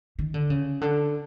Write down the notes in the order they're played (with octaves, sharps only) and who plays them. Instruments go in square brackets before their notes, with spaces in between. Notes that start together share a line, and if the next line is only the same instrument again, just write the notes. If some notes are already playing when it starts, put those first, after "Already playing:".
[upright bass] D#3
D3
C#3
D3